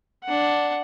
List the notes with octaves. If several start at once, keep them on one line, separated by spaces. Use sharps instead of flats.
D4 F#5